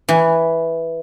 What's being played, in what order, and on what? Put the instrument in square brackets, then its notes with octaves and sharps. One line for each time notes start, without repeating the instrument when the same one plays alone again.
[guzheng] E3 G#5